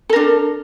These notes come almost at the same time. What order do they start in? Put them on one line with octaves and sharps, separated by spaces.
A4 A#4 D4